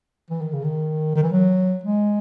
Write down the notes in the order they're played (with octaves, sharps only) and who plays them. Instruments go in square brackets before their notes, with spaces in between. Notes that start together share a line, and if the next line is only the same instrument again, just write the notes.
[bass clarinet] E3
D#3
C#3
D#3
D#3
E3
F#3
G#3